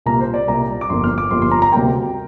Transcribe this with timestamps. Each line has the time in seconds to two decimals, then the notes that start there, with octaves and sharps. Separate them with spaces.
0.06 C2 A#2 A#3 A#5
0.21 C5
0.34 D5
0.47 C2 A#2 A#3 A#5
0.81 D6
0.90 G1 F2 F3 A#3 C6
1.04 F6
1.18 D6
1.31 G1 F2 F3 A#3 C6
1.42 C6
1.51 A#5
1.62 A#5
1.72 D2 C3 G3 A#3 G5